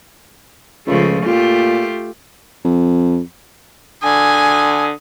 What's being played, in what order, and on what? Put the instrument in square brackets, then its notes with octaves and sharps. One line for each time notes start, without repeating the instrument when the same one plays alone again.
[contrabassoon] C#2 [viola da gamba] C#3 F3 A3
[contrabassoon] A#2 [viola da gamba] A3 F4 G4
[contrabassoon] F2
[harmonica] D3 D#6 [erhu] G#5